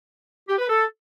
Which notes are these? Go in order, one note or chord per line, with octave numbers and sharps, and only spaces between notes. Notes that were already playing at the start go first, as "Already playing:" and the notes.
G4
B4
A4